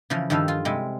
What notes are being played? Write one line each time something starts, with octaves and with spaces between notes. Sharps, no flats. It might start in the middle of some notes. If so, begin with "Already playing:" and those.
C#3 E3 F3
G2 D#3 F3 A4 F5
F4
C3 G3 G#3